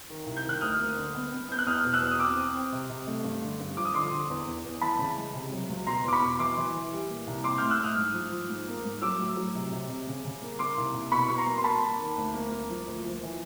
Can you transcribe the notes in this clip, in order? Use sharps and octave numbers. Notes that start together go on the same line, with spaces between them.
D#3
C2
G6
D#3 F#6
D2 D#6 F6
A#3
D3
B3
B3
B3 G6
F#6
E2 D#6 F6
B2
E6 F#6
E2
D#6
C4 D6 E6
C4
C4
C3
C3
A3
G2
D3
G2
F3 D6
D#6
D3 C6 D6
D3
E2
E2
E2
E3 A5 B5
C#3
G#3
C3
F#3
C#2
B2 A#5 C6
E2 D6
B5 C#6
B2
E3 C6 D6
E3
E3
G3
A#2
C2
C4 C6 D6
F6 G6
A2
E6 F#6
A2 D#6 F6
G#2
F3
F3
G#2
A#3
G#2
F#3 D6 E6
A2
F#3
C3
C3
C3
C#3
C#3
A#3
A#3 C6 D6
C2
C2
B2 B5 C#6
B2 C#6
A#5 C6
A#3
C6
A#3 A5 B5
A#3
D#3
D2
A#3
A#3
F3
D2
F3
E3